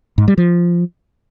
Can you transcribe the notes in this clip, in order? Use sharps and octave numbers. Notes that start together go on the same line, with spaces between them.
G#2
G3
F3